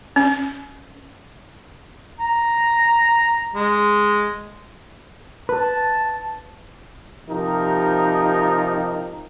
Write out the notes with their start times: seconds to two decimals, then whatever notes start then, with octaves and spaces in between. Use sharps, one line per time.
0.16 C#4
2.20 A#5
3.54 G#3
5.49 B4 A5
7.28 C3 F3 D#4 G4 A#4